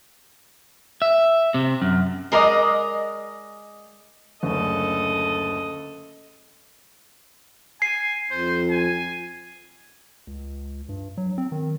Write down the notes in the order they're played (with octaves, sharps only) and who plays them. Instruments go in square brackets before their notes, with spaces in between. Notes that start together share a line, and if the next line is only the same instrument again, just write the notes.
[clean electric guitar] E5
C3
F#2
[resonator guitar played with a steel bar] G#3 A#4 B4 D5 D#5
[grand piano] F#1 D2 [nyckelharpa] A4 D#5
[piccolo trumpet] G#5 [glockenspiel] C7
[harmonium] F2 [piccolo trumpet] C5
[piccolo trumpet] G#5
[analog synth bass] C#2
G2
F#3
C4
D#3